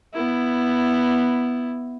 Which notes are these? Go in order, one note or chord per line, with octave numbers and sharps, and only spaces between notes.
B3 E4